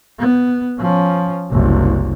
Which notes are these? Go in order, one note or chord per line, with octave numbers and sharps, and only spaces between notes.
B3
F3 C#4
F#1 C2